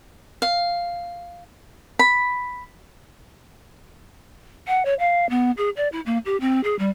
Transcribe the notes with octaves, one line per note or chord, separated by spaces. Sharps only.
F5
B5
F#5
C#5
F5
B3
G#4
D5
E4
A#3
G4
C4
G#4
G3